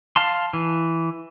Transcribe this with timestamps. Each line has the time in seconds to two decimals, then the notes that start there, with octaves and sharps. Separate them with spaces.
0.16 F5 A5 C6
0.53 E3